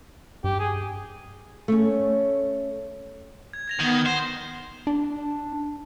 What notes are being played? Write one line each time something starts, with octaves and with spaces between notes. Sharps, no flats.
G2 G4
G#4
A3 C#4
G#6
G#6 A#6 F7
D#3 B3
C5
D4